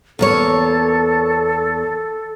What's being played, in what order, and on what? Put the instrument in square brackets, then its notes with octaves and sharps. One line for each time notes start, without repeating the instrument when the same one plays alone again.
[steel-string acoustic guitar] E2 A#3 C#5 [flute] A4